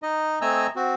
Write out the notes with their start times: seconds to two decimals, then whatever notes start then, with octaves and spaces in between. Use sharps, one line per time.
0.02 D#4 D#5
0.41 A3 C4 D#5 G#5 A#5 E6
0.76 C4 F#4